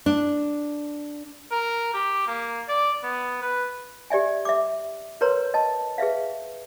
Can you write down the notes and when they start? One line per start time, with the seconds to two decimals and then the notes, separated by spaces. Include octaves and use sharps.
0.06 D4
1.51 A#4
1.94 G4
2.27 A#3
2.68 D5
3.03 B3
3.42 B4
4.10 G4 D5 E5 G#5
4.45 E5 D6
5.21 A#4 B4 C#5 A#5 C6
5.54 D#5 A5
5.98 G#4 B4 E5 F5